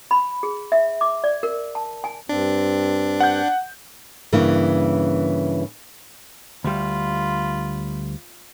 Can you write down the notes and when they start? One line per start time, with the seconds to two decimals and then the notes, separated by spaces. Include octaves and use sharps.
0.11 B5
0.43 G#4
0.72 E5
1.01 D6
1.24 D5
1.43 A#4
1.75 A5
2.04 G#5
2.29 G2 C4 D4
3.20 F#5 G6
4.33 G2 C#3 E3 A#3
6.64 D2 G3 F4 B5